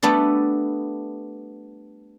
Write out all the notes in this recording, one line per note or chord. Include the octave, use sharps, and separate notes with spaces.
G3 A3 B3 D4 A4